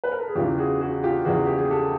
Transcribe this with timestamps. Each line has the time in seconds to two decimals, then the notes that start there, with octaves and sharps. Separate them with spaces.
0.04 B4
0.12 A#4
0.20 A4
0.28 G#4
0.35 E2 C#3 E3 F4 G4
0.58 F#4 G#4
0.80 F#4 G#4
1.03 F4 G4
1.25 E2 C#3 E3 F#4 G#4
1.46 G4
1.58 G#4
1.71 G4 A4